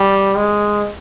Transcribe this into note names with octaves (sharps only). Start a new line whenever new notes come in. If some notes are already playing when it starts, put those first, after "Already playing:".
Already playing: G3
G#3